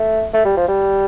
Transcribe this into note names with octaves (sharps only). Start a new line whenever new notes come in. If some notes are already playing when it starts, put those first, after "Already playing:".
Already playing: A3
A3
G3
F3
G3